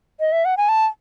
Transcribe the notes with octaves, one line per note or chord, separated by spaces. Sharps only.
D#5
E5
F#5
G#5
A5